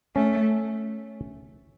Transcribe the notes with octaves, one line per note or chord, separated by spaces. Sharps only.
A3 C#4